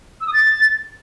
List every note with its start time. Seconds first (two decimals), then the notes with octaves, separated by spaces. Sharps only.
0.21 E6
0.27 D#6
0.33 A6